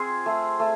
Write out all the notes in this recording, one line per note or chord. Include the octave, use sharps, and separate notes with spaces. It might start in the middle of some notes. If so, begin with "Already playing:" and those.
Already playing: C4 F4 G#4
A3
A3